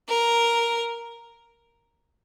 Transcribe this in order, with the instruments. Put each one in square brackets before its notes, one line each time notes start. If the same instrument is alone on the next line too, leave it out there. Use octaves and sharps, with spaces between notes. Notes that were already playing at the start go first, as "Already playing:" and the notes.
[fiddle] A#4